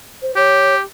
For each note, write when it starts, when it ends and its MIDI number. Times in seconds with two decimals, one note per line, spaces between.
0.22 0.32 72
0.36 0.81 67
0.36 0.74 73